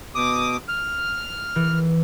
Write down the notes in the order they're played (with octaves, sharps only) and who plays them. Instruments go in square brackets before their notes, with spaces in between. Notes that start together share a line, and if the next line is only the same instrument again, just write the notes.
[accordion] B2 D6 D#6
F6
[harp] E3